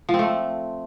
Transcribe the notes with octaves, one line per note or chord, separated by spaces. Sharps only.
F3
C4
A3